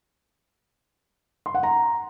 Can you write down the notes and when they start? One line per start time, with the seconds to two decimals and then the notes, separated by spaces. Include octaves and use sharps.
1.46 C6
1.55 F#5
1.63 A#5